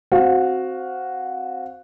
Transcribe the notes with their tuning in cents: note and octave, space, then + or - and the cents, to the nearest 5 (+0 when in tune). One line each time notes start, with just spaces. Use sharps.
C4 +0 F#4 +0 F5 +15